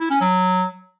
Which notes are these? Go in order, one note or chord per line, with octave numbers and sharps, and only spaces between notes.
E4
C#4
F#3